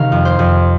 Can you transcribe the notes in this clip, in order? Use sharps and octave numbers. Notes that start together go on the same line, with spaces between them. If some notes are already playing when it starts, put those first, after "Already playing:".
Already playing: C3 D#3 F5 A#5
F2
C5
F2